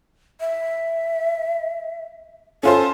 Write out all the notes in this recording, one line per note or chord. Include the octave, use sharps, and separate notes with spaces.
E5
C#4 F4 A4 C5